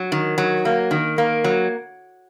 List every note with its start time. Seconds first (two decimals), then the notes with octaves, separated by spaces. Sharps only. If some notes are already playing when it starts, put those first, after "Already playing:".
Already playing: F#3
0.12 D#3
0.38 F#3
0.65 A#3
0.91 D#3
1.18 A#3
1.44 F#3